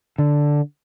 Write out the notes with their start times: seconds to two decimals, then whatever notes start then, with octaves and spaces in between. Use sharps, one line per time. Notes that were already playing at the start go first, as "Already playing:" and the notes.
0.18 D3